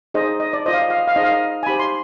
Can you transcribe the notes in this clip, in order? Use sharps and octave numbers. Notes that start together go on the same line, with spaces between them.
D#4 G#4 C5 D#5
D#5
D5
F4 C5 D#5
F5
D#5
F5
D#5
F5
D#4 G#4 C5 D#5
F5
D#5
G#5
D#4 G4 C5 B5
C6